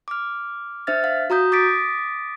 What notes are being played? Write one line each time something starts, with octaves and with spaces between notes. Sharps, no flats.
D6 F6
D4 C5 E5 F6 A6
F5
F#4 A#5 D#6 G6
D6 D#6 A6 B6 D7